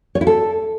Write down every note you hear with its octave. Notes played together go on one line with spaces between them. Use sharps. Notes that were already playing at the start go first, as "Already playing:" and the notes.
C#5
E4
A4